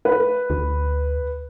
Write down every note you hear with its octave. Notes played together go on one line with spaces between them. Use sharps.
B4
D2